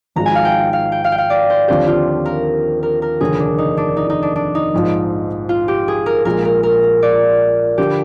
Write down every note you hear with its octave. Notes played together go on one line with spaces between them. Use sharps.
G#1 G#2 F3 G#3 A#5
G#5
F5
G5
F5
G5
F5
G5
F5
D5
C5
D#2 D3 F3 C4 G4 C5
F4
A#4
A#4
A#4
F1 D#2 D3 G#4
D4
D#4
D4
D#4
D#4
D4
D4
D#4
A#1 G#2 F3
F4
G4
G#4
A#4
A#1 A#2 G#3 A#4
A#4
A#4
D5
D3 F3 G4